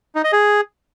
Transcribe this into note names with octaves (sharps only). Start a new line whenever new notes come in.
D#4
D#5
G#4